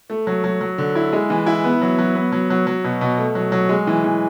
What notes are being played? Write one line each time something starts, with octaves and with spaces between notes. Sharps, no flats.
A3
F#3
F#3
F#3
D3
E4
G#3
E3
E4
B3
F#3
F#3
B3
F#3
F#3
F#3
B2
B2
A3
F#3
F#3
G#3
E3
E3